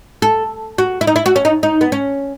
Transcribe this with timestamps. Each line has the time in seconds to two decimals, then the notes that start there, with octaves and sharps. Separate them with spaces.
0.22 A4
0.78 F#4
1.01 E4
1.07 D#4
1.16 E4
1.26 F#4
1.36 C#4
1.45 D#4
1.63 D#4
1.81 B3
1.92 C#4